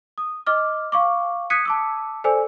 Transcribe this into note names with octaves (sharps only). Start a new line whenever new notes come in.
D#6
D#5 D6 F6
F5 C#6 D6
D#6 F#6 G#6 B6 C#7 D#7
A5 D6 E6
A4 C5 D5 G#5 E6